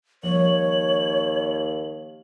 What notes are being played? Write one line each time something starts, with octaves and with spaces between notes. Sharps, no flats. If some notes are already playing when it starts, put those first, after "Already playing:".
D#2 F3 G3 C#5 F#7